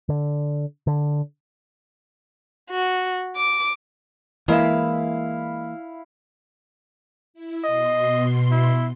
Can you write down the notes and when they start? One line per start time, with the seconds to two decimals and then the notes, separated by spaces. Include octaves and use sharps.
0.09 D3
0.87 D3
2.70 F#4
3.36 D6
4.48 E3 G#3 A#3 E4 E5 F5
7.34 E4
7.64 B2 D#5 C6
8.51 E4